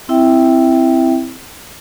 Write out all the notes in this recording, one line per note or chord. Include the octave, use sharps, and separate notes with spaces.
C4 E4 E5 G5